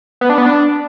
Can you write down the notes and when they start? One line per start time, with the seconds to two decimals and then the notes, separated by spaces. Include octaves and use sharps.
0.21 B3
0.30 D4
0.38 B3
0.46 D4